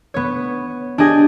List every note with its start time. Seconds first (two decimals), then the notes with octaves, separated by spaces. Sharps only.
0.14 B3 C#5
0.98 D4 G4 G#4 D#5 G#5